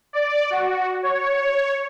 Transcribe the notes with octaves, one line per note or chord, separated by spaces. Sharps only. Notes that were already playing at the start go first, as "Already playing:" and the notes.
D5
F#4
C#5